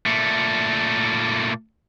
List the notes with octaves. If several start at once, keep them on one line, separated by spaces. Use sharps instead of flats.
A#2 A3